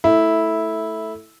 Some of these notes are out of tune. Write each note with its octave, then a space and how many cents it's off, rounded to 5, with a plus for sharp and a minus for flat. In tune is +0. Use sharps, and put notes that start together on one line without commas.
A3 +0 E4 -10